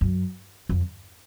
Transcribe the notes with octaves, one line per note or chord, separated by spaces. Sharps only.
F#2
F2